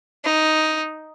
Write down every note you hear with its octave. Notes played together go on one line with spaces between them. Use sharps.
D#4